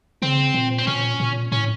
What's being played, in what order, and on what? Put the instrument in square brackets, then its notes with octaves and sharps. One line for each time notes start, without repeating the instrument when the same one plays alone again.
[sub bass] C#3 [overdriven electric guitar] C4
[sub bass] A#2
[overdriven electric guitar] C4
[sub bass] A#2 [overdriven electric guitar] C#4
[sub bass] A#2
[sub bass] A2 [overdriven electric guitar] C#4